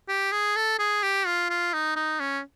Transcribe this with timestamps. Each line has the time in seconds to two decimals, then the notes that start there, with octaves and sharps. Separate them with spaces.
0.08 G4
0.32 G#4
0.56 A4
0.79 G#4
1.03 G4
1.26 F4
1.50 F4
1.73 D#4
1.96 D#4
2.20 C#4